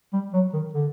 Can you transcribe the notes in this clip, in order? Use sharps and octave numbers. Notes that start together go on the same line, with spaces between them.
G3
F#3
D#3
D3